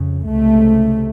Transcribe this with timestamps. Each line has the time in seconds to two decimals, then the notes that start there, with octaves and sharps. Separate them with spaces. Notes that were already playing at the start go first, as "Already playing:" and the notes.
Already playing: F2 C#3
0.28 C#2 C3 A3